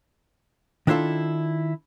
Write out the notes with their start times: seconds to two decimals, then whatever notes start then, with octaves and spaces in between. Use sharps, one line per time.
0.87 D#3 D4 E4 F4 A4